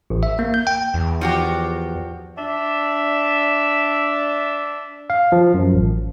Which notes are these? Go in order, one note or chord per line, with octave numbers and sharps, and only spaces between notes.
A1
E5
A#3
G6
G5
E2
F3 F#4 G4
D4 E5
F5
F3
F#2
A1